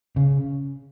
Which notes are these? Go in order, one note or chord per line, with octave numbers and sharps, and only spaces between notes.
C#3